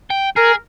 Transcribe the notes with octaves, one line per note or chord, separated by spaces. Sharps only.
G5
G#4 A#4